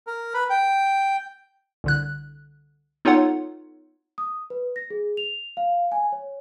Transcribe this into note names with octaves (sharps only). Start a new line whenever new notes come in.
A#4
B4
G5
C2 D3 F#6
B3 D#4 F4 A4 C#5 F#5
D#6
B4
A#6
G#4
F7
F5
G#5
C#5